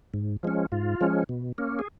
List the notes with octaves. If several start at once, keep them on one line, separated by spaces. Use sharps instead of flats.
G#2
F3 G#3 C#4
G#2 F4
F3 G#3 C#4
B2
A#3 C#4
G#4